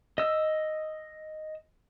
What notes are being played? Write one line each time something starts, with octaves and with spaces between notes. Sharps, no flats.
D#5 E6